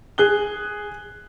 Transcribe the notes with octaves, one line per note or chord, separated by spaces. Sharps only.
G#4 F#6 G7